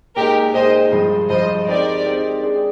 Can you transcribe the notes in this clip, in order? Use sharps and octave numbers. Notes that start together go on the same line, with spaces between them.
A#2 G#3 D#4 G4 A#4
A#2 G#3 D#4 C5 D#5
G2 F3 G#3
G2 F3 G#3 C5 D#5
G#3 C4 D#4 G4 A#4 D5
G#3 C4 D#4 G4
G#3 D4 G#4 D5